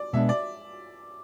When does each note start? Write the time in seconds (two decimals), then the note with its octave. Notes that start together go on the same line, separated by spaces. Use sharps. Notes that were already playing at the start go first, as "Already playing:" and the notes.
Already playing: D5
0.13 B2 G#3 B3 D4 E5
0.29 D5